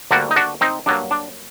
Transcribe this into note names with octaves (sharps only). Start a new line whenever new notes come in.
D2 D3 G3 A#3 D4 F#4
D#4
D4 F#4
C4 D#4
G2 F#3 A#3 D4
D4